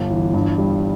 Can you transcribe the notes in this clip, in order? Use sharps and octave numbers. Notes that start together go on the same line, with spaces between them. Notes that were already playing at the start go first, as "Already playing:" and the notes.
Already playing: G1
E3
G2
G3